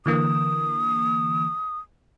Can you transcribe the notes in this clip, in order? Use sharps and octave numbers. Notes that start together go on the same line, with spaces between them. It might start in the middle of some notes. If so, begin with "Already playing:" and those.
D3 E3 A#3 D#6